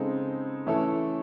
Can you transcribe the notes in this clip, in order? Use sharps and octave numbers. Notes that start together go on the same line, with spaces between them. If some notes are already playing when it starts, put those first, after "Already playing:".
Already playing: C#3 G#3 C4 D#4 A4
E3 A3 C#4 E4 A4